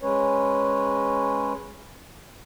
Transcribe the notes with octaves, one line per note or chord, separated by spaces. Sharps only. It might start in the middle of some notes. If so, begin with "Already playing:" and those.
G#3 C#4 B4 C#5